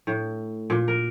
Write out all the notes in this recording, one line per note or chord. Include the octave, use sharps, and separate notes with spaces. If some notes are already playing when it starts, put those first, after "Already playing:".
A2
A#2
A#4